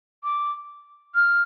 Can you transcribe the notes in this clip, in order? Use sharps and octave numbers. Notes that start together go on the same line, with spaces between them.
D6
F6